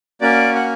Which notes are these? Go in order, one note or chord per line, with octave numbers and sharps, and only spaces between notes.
A#3 C#4 F#4 D5
F#5